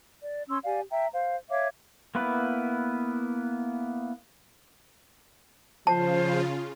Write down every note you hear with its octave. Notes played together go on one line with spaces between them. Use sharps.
D5
C#4 C6 E6
G4 D5 F5 G#5
E5 G5 A#5
C5 F5
C#5 E5 F5 D6
A#3 B3 E4 B4
C#3 F3 F4 C5 A5